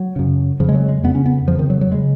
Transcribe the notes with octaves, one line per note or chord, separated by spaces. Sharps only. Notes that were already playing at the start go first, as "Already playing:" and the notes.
Already playing: F#3
F#2 C#3
F2 C#3 F3
G#3
F#3
G#3
F2 C#3 B3
C#4
B3
F2 C#3 F3
D#3
F#3
F#3
C#3 G#3